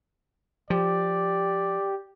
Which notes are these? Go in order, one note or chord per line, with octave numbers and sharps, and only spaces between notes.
F3 G4 D5